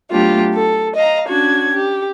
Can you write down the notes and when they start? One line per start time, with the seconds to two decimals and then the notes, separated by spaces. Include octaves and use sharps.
0.11 F#3 A3 B3 D4 F4 G4
0.54 A4
0.95 D#5 F5 A#5
1.27 C#4 D4 F#4 G#6
1.74 G4